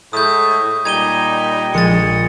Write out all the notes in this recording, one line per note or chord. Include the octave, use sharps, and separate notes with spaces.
A2 G#3 A3 D#6 G6
A#2 G3 D#4 G5 G#6 D#7 G7
A#1 G#3 A6 C#7